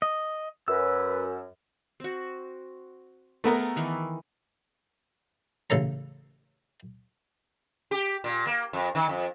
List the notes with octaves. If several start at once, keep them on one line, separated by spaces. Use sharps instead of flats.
D#5
F#2 B4 E6
C4 F#4
A3 B3 G#4 A#4
D#3 E3
A1 C#3 A4 C#5 A#5
G4
A#2
A#3
F2
D#3
F2